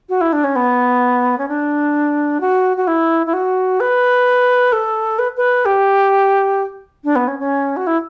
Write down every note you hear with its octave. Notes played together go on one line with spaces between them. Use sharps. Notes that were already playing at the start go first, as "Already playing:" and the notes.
F#4
E4
D4
C#4
B3
C#4
D4
F#4
F#4
E4
E4
F#4
B4
A4
B4
B4
G4
D4
B3
C#4
C#4
F#4
E4